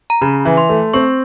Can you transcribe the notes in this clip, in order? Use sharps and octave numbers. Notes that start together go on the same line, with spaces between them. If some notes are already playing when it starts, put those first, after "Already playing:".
A#5
C#3 B5
E3
C6
A3
C4 C#6